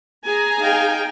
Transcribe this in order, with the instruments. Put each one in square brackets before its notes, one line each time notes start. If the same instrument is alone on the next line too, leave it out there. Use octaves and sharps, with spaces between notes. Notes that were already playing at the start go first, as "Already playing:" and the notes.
[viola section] G#4 G#5 A#5
[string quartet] D#4 F5 G5